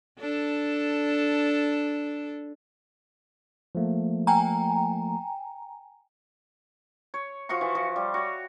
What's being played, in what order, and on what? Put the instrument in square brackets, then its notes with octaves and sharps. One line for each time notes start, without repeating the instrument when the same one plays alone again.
[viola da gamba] D4 A4
[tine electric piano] F3 A3 A#3
[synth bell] G5 G#5 A#5
[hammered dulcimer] C#5
F3 F#4 F5 C#6
E3
F3
G3
F#4 C#5